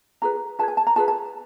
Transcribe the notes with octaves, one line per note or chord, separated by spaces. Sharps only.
F4 G#4 B4 A#5
F4 G#4 B4 A5
G#5
A5
A#5
F4 G#4 B4 A5
A5